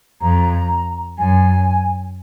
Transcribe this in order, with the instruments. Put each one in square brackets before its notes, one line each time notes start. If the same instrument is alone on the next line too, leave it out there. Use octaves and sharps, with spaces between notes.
[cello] F2 [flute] A#5
[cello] F#2 [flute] G#5